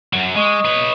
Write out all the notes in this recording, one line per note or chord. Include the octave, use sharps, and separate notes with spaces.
F#2 F#3
G#3 D#5 C#6 D#6
B4 C#5